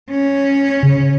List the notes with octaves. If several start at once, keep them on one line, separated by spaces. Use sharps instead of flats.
C#4
C#3